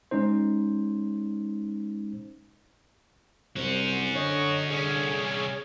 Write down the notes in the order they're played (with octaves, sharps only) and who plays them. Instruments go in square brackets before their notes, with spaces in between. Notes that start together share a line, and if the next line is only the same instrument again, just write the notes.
[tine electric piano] G#3 C#4 D#4 C5
[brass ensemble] C2 C5 [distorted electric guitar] C#4 F#4
[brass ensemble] D3 [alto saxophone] C#5 [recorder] D#5
[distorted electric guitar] C2 C#4 [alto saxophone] G#4 [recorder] C#5